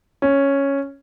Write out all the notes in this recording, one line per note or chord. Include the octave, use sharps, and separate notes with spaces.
C#4